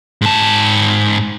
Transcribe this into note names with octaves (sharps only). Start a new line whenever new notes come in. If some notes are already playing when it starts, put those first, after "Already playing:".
G#2 A5